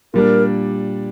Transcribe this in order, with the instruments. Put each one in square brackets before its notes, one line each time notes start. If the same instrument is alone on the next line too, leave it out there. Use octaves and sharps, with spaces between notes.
[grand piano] A#2 G3 D4 [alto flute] A#4